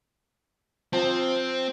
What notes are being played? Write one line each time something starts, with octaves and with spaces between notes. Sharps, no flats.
F3 C4 A5